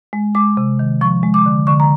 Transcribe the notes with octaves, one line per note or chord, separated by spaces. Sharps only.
G#3
G#3 D6
C3
D#3
F3 C#6
G#3
D6
D3
D3 C#6
A#5